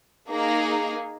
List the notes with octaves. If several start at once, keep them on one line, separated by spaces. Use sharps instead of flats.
A#3 D#4 G#4 A#5